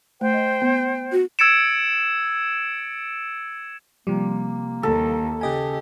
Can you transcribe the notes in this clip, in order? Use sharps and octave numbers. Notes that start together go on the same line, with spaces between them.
A3 C5 G5
D#5
B3
F#4
E6 G#6 A6 C#7 D7 E7
C3 F3 G3 A#3
D#2 A4
C#3 G4 D#5 G#5